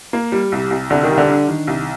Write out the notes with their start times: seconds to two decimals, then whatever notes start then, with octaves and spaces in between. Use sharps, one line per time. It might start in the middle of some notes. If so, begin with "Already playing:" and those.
0.13 A#3
0.32 G3
0.52 C2
0.70 C2
0.90 C2 D3
1.03 D#3
1.10 G3
1.18 D3
1.29 D4
1.48 D#3
1.67 C2